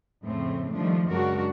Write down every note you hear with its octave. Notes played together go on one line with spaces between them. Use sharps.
F2 A2 C#3 A3 C4
D#3 F3 G3 A3 D4
F#2 C#3 G#3 D4 F#4 A#4